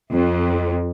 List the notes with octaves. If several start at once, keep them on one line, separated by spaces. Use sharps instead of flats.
F2